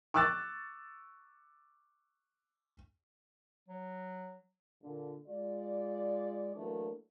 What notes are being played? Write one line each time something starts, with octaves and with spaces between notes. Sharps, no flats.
C#6 D6 E6 F#6 A6
F#3
A#2 D3
G#3 F4 D5
E3 F#3 A3 A#3 D4